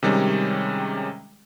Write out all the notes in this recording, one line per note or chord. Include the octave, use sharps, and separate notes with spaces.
C3 D#3 G3 G#3 C#4